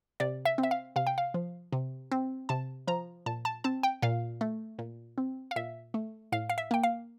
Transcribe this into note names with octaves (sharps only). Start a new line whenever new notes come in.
C3 D5
E5
C4
E5
F5
C3 F5
G5
F5
F3
C3
C4
C3 A5
F3 A#5
A#2 A5
A5
C4 A5
G5
A#2 F5
A3
A#2
C4
F5
A#2 E5
A3
A2 F5
F5
E5
A#3 G5
F5